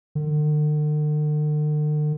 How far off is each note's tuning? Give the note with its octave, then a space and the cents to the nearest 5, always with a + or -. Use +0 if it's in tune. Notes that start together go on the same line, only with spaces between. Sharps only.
D3 +45